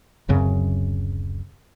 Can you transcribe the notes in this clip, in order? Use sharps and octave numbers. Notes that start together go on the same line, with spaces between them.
D1 F#2 C#3 C4